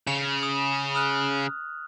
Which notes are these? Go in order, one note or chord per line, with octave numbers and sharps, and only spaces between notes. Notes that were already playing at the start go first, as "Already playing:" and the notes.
C#3 F7
D#6
D#6 F6 F#6